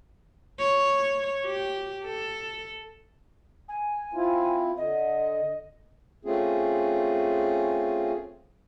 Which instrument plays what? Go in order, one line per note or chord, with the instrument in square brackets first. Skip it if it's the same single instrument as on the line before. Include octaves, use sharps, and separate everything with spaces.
[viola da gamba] C#5
G4
A4
[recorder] G#5
[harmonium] C4 E4 F4
[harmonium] D3 [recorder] D#5
[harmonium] A3 C4 C#4 F4 G#4